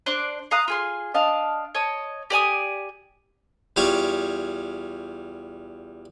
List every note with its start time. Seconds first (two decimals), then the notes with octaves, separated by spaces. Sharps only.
0.06 D4 C5 D5 F#6
0.51 F5 A#5 D#6 F#6
0.68 F4 G#4 C6
1.14 D4 D#5 F5 A5
1.75 C#5 D#5 A5
2.30 G4 D5 G#5 D#6
3.76 E2 G3 F4 C#5 C#6 D6